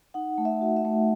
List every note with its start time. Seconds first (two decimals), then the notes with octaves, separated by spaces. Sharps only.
0.14 D#4 F#5
0.38 A3
0.45 E5
0.61 F#4
0.76 E5
0.85 A3